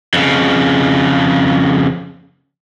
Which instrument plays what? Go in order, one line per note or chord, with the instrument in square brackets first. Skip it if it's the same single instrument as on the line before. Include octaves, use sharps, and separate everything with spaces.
[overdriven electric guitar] F2 C#3